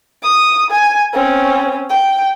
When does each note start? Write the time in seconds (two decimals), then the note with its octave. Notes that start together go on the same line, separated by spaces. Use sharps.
0.23 D#6
0.71 G#5
1.13 C4 C#4
1.90 G5